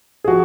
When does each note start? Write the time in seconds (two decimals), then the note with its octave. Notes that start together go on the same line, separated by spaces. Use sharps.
0.24 G#4
0.28 F3 F#4